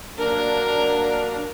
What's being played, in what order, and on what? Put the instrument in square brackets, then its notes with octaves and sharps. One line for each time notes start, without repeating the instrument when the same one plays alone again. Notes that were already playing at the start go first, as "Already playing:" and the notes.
[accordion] F#3 A#3 D4 [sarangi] A#4